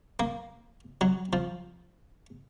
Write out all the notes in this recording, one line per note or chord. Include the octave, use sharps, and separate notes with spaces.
A#3
F#3
F3